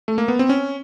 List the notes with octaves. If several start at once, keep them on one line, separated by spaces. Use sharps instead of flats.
A3
A#3
B3
C4
C#4